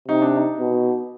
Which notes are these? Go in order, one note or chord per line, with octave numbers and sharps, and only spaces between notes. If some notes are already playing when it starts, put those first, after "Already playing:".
C3 D#4
D4
D#4
B2